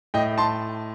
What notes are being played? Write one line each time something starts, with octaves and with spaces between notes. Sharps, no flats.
A2 D#5 G5
A5 C6